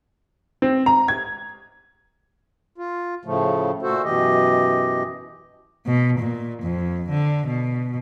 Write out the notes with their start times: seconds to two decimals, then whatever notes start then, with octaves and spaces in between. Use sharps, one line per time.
0.62 C4
0.86 A#5
1.08 G#6
2.78 F4
3.25 A2 C#3 F3 A3
3.82 A#2 A3 F#4 A4 C5
4.04 F#2 B2 E3 G4 D#5
5.87 B2
6.19 A#2
6.63 F2
7.10 D3
7.47 B2